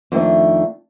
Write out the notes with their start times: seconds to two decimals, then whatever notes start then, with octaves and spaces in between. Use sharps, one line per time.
0.12 F2 D#3 G3 A3 D4